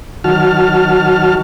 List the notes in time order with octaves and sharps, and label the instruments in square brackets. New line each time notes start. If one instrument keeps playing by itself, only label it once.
[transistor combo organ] D#3 F#3 F#4 A5 F6